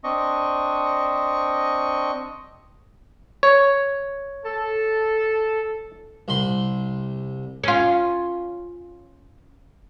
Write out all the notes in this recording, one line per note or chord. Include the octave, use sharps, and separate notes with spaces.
C4 D4 D#5 C#6
C#5
A4
C2 B5 C6
C#4 F4